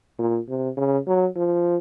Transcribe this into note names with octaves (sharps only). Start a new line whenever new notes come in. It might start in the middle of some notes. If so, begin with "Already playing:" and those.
A#2
C3
C#3
F#3
F3